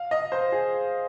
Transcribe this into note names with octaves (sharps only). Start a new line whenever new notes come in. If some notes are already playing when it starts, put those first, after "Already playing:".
Already playing: F5
D#5
C5
G#4